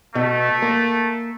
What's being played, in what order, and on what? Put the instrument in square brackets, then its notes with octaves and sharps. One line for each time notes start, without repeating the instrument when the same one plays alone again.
[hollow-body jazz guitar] B2 [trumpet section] A3
[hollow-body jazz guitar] A#3